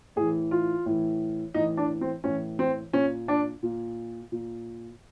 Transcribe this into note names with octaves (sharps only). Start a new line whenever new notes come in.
A2 E3 G#4
F4
A2 E3
A2 E3 D#4
D4
C4
A2 E3 C#4
C4
A#2 C#4
D4
A#2
A#2